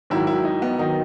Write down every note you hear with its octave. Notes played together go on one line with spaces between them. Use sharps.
G#2 D#3 F#3 E4
E4
D#4
B3
D#3 F#3 D#4